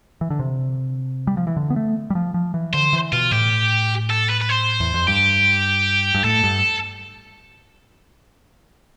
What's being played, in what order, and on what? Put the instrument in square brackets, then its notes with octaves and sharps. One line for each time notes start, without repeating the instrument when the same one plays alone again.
[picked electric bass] E3
D3
C3
G3
F3
E3
D3
B3
A3
G3
F3
F3
E3
[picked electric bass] D3 [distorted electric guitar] C5
[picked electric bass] E3
[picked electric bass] B2 [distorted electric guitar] F4
[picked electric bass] A2 [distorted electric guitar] G4
[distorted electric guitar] A4
B4
B4
C5
[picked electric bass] E2
F2
[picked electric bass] G2 [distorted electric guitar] G4
[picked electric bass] G2
[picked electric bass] A2 [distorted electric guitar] A4
[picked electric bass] G2